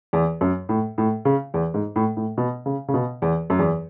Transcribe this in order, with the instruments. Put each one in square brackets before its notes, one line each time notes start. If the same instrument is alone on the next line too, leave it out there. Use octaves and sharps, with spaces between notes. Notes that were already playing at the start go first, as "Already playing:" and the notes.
[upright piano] E2
F#2
A2
A2
C#3
E2
G#2
A2
A2
B2
C#3
C#3
B2
E2
F#2
E2